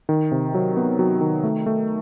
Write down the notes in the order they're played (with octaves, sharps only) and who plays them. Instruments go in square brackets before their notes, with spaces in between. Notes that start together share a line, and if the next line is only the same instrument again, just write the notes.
[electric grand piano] D#3
C3
F#3
B3
F#3
D#3
A3
A3